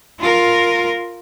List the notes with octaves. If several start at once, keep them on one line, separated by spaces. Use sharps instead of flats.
F4 A#4